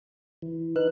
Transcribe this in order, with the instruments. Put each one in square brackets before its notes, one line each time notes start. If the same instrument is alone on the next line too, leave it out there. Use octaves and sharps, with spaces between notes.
[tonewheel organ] E3
[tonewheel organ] D#4 F#6 [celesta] B4